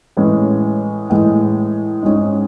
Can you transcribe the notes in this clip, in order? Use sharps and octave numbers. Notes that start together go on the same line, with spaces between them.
A2 E3 G#3 C#4
A2 E3 G#3
G#2 G#3 C#4